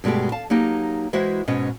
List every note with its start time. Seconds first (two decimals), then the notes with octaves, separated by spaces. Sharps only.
0.04 G2 B2 G#3 A3 G4
0.32 F5 A5
0.50 F#3 A#3 D#4 G4
1.13 E3 G#3 E4 F#4 C5 E5
1.48 G#2 B2 C#4 D#5